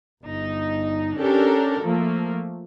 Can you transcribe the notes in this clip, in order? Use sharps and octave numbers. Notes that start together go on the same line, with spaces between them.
G1 D#4
C#4 D4 G4 A4 A#4
F3 A3 A#3